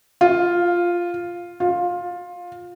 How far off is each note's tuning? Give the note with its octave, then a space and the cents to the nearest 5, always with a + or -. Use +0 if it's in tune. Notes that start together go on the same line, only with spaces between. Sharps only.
F4 +0
F4 +15